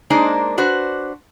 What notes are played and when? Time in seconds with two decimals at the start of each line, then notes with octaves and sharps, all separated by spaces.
0.10 G#3 A#3 D4 D#4 A#4 C5
0.58 D4 F#4 B4 C5